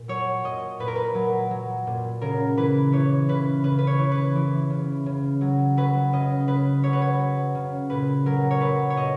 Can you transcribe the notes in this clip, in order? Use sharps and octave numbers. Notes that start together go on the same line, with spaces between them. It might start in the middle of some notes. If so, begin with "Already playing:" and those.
Already playing: A#2
F#3 C#5
A#2 D#5
A#2 B4
A#4
B4
F#3
F#3
A#2
C#3 A#4
E3 B4
E3 C#5
C#3 B4
C#3 B4
B4
C#5
E3
B4
E3
C#3
C#3
F#3
F#3 B4
C#3 D#5
C#3 B4
F#3 C#5
B4
C#5
F#3
C#3
A#2 B4
F#3 A#4
C#5
F#3 B4
C#5
A#2 D#5